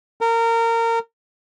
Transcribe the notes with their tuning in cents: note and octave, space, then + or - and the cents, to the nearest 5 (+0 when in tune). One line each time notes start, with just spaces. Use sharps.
A#4 -25